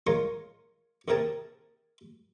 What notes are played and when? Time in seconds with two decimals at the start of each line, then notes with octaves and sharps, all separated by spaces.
0.07 G#3 F4 A#4 C#5 F5 C#6
1.08 D#2 C3 G#4 A#4 G5 A5